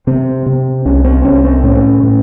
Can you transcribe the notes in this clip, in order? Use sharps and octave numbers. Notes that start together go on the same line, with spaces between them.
C3 C4
C3
C2 C#4
C4
C2 C#4
C4
A2 C#4
A2